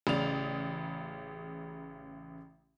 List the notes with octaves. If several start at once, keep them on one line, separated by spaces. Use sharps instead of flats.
A1 C#3 D5 F7